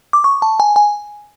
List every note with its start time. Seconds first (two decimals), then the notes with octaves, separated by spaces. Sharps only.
0.13 D6
0.24 C#6
0.42 A5
0.60 G#5
0.76 G#5